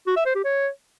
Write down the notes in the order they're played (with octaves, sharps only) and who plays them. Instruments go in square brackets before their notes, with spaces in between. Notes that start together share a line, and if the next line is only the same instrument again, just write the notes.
[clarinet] F#4
E5
C5
G4
C#5